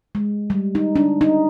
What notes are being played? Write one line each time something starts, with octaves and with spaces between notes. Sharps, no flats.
G#3
G3
D#4
D4
D#4